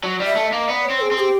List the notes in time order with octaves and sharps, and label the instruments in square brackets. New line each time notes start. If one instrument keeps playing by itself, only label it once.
[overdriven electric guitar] F#3
G3
[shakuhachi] E5
[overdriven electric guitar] A3
[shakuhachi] D#5
[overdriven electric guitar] A#3
[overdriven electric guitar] B3 [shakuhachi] D5
[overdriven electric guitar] C4 [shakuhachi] C#5
[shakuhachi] G#4
[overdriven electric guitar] C4
[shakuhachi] G#4
G4